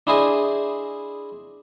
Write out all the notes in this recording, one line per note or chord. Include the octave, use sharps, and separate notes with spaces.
D4 E4 G#4 C5 D#5